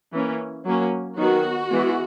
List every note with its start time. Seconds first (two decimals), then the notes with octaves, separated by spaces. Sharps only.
0.13 E3 A#3 C#4
0.65 F#3 A#3 C#4
1.17 D#3 F#3 B3 F#4
1.70 E3 G#3 B3